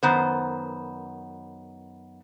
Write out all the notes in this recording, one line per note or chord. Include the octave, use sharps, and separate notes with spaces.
F#2 D#3 B3 C5